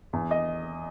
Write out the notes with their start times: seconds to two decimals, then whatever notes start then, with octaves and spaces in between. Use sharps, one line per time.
0.13 E2
0.31 D#5